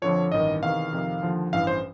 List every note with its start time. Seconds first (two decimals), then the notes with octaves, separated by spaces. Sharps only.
0.02 F2 D3 F3 C#5
0.32 A1 G2 D#3 D#5
0.63 E2 C3 D#3 F5
0.93 F2 C3 D#3
1.22 D#2 D3 F3
1.52 A1 G2 E3 F5
1.67 C5